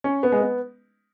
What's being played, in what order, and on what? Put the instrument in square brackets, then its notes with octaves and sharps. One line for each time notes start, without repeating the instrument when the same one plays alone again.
[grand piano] C#4
B3
G#3
B3